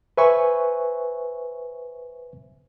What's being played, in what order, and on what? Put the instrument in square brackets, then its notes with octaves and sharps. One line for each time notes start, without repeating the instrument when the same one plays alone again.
[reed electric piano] B4 C5 E5 G#5 C#6